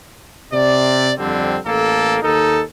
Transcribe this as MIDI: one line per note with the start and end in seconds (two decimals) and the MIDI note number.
0.52 1.12 48
0.52 1.12 74
1.18 1.58 41
1.18 1.58 50
1.18 1.58 55
1.18 1.58 60
1.66 2.19 33
1.66 2.19 58
1.66 2.19 69
2.22 2.62 39
2.22 2.62 63
2.22 2.62 69